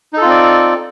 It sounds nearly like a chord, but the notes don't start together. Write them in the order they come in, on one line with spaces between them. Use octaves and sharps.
D#4 A4 F4 C4 D5